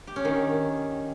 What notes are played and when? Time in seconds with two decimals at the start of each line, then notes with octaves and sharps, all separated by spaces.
0.07 G4
0.16 C#4
0.25 D#3